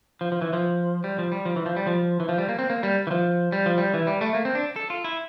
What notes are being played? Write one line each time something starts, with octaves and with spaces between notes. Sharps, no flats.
F3
F3
E3
F3
G3
F3
G3
F3
E3
F3
G3
F3
E3
F3
G3
A#3
C4
A#3
G3
E3
F3
G3
F3
G3
E3
G3
A3
A#3
C4
D4
A4
F4
E4